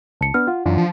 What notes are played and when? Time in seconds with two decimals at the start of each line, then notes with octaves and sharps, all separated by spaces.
0.21 C#2 A5 C#7
0.34 B3 D4 F6
0.47 F4 F#5
0.66 F#2 E3 D4 F4
0.78 F3